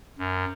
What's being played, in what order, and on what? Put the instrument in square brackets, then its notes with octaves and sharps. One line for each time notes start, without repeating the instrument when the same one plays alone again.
[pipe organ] F#2